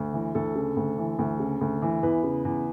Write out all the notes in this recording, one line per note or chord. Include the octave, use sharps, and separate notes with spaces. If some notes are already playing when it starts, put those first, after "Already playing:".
Already playing: D2
E3
D2 A4
C#3
D2
E3
D2
C#3
D2
E3
E2 B4
C#3
E2